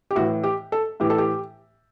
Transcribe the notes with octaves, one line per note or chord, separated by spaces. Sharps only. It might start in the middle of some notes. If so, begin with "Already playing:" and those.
G4
A2 E3 F#4
G4
A4
A2 E3 G4
A4
G4